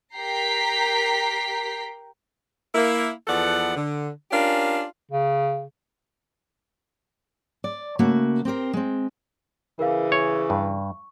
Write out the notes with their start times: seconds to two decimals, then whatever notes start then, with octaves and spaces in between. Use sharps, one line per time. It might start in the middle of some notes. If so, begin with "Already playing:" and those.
0.15 G4 A#4 G5 A#5 B6 C7
2.75 A#3 E4
3.28 E2 F3 B3 A4 D5 F#5
3.76 D3
4.31 C#4 D4 F4 G4 A#4 D5
5.11 C#3
7.64 D5
7.99 C#3 A3 A#3 F#4
8.45 C4 G4 A#4 C5
8.73 G#3 C4
9.79 C#3 E3 A#4 F5
10.12 C#5 C#6
10.50 G2